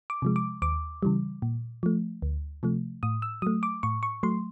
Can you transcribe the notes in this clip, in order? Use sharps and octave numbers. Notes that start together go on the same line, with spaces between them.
D6
C3 F3 G#3
D6
D#2 D6
C#3 E3 G3
A#2
F3 A3
D2
C3 F3 A3
A2 D#6
E6
F#3 A3 D#6
D6
A2 C#6
C#6
F#3 A3 C6